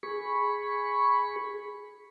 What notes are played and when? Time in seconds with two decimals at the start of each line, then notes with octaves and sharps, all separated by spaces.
0.03 G#4 B5 C#6